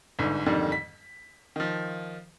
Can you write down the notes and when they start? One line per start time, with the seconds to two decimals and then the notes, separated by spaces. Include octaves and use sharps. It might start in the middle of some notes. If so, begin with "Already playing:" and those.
0.19 G1 G#2 D3
0.46 F2 G#2 D3 D#3 G3
0.72 B6
1.56 D#3 F3